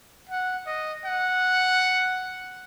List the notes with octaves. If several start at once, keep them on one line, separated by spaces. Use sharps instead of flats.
F#5
D#5
F#5